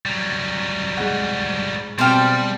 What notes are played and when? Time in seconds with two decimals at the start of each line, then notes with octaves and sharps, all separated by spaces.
0.06 F#3 G3
0.97 G#2 F#5
1.99 B2 G3 C4 G4 C5 F5 G5